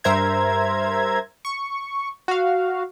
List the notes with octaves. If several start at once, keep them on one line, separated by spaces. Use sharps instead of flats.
G2 A#4 C5 E5 A#5 G#6
C#6
F#4 F5